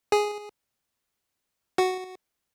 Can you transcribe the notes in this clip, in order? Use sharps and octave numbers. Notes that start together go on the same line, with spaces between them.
G#4
F#4